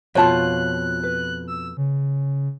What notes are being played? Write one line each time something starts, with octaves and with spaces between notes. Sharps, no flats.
F2 B2 F4 C#5 A5 F#6
B4
E6
C#3